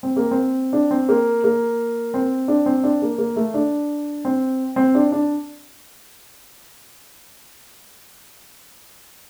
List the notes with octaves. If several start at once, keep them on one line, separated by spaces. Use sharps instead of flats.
C4
A#3
C4
D4
C4
A#3
A#3
C4
D4
C4
D4
A#3
A#3
A3
D4
C4
C4
D4
D4